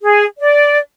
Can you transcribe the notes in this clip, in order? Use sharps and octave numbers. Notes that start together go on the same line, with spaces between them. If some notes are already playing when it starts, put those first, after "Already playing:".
G#4
D5